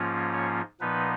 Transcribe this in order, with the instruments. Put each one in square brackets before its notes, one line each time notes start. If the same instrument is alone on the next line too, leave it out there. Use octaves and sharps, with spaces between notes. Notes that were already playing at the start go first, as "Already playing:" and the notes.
Already playing: [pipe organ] G#2 F3 A#3 C#4 F4
C#5
A#2 F3 B3 D#4 B4